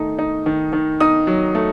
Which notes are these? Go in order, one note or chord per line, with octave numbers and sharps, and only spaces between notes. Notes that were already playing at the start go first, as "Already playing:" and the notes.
Already playing: D#3 A3 D#4
D#4
D#3
D#3
D#4 D#6
F#3
A3